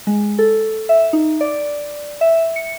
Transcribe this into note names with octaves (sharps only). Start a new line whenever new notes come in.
G#3
A4
E5
D#4
D5
E5
C#7